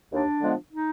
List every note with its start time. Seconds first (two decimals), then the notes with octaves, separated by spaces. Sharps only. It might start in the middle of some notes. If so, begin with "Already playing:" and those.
0.13 D#2 D4
0.42 D3 F3 G#3 B3
0.72 D#4